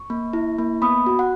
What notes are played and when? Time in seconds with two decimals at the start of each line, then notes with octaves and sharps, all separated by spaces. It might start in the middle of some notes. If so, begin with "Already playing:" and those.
Already playing: C#6
0.10 A#3
0.33 E4
0.58 A#3
0.82 B3 B5 D#6
1.06 F#4
1.19 F#5